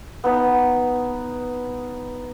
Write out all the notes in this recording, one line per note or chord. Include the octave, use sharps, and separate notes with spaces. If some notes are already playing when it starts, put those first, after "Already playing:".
B3 D#4